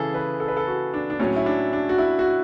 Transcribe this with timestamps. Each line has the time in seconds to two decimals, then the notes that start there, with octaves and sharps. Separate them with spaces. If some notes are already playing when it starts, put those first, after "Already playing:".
Already playing: C#3 E3 G#4 A4
0.14 B4
0.40 A4
0.48 B4
0.57 A4
0.67 F#4
0.94 D4
1.10 D4
1.19 A2 F#3 C#4
1.36 E4
1.46 D4
1.73 D4
1.89 F#4
1.98 E4
2.19 F#4